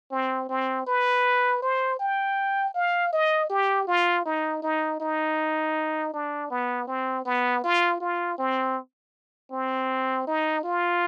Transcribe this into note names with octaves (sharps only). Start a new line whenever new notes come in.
C4
C4
B4
C5
G5
F5
D#5
G4
F4
D#4
D#4
D#4
D4
B3
C4
B3
F4
F4
C4
C4
D#4
F4